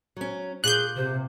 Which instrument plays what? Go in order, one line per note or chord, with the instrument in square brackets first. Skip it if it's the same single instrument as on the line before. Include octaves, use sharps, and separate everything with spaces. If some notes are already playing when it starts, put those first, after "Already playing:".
[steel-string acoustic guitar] F#3 C#4
[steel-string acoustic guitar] A#2 [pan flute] G#4 [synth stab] F#6 G6
[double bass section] C3 [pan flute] C5